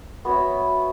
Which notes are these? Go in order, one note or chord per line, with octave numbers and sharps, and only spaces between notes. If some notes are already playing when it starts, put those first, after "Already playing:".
B3 F#4 C#5 E5